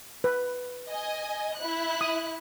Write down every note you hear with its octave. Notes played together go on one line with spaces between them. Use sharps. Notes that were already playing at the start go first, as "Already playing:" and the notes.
B4
D#5 G#5
E4 F#6
D#6